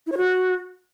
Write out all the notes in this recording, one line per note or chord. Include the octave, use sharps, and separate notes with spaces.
E4
C#5
F#4